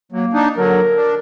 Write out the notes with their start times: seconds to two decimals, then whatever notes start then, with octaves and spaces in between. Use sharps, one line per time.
0.12 F#3 A#3
0.33 D4 D#4
0.57 D3 F#3 A#4
0.96 D4